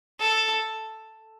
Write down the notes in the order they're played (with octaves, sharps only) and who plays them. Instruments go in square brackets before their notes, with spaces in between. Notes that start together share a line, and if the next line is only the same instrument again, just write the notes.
[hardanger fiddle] A4